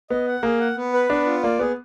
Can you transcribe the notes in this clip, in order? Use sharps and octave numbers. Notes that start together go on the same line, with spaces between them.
B3 D#5
F#5
A#3 G#4
F#5
B3
B4
B3 D4
F4
A#3 D5
B3 G#4